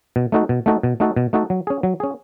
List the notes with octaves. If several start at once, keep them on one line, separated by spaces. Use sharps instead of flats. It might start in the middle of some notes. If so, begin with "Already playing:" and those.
B2
A3 D#4 F#4 A4
B2
A3 D#4 F#4 A4
B2
A3 D#4 F#4 A4
B2
A3 D#4 F#4 A4
F#3
C#4 G#4
F#3
C#4 G#4